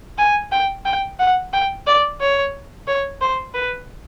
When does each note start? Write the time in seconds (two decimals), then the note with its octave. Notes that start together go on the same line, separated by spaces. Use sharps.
0.18 G#5
0.52 G5
0.85 G5
1.19 F#5
1.53 G5
1.87 D5
2.20 C#5
2.87 C#5
3.21 C5
3.54 B4